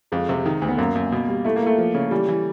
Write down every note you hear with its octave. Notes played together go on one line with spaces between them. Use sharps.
F2 G#3
C3
D#3
D2
B3
F#2 A#3
F#2
B2
G3
A3 E4
A#3
A3 E4
F3
C#3
E3 G3
E3